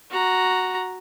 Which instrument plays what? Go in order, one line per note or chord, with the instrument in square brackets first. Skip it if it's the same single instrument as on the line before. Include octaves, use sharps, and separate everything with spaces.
[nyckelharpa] F#4 A#5